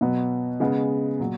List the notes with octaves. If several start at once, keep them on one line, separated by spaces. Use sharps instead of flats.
B2 F#3 B3
C#3 G#3 B3
A#2 F#3